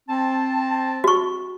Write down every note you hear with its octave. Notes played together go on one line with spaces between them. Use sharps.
C4 A5
F#4 C#6